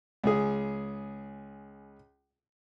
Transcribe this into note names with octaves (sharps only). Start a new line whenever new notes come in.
C#2 G#4